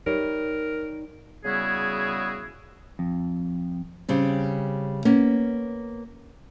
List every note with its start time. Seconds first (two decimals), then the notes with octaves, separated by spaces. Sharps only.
0.07 G3 D#4 A#4 C#5
1.45 C#3 G3 B3 E4 F#4 G#4
2.99 F2
4.09 C#3 G3 C4
5.05 A#3 B3 C#4